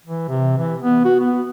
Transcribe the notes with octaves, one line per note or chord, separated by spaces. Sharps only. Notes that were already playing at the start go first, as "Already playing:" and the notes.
E3
C3
E3
B3
F#4
B3